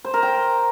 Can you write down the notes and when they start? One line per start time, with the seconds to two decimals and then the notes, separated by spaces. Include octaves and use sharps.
0.05 C5
0.14 A#4
0.23 G5